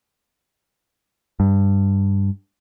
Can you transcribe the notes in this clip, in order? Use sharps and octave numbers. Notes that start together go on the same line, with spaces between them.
G2